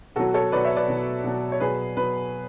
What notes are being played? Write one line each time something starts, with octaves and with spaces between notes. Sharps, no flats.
B2 F#3 F#4 A4
A4 C#5
B2 F#3 B4 D5
C#5 E5
B4 D5
B2 F#3
B2 F#3
C#5
B2 F#3 G#4 B4
B2 F#3 B4